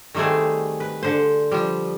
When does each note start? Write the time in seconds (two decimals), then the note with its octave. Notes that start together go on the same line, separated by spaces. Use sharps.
0.15 D#3 G3 A3 C4 G#4
0.80 B4
1.03 D3 C5
1.52 F3 G3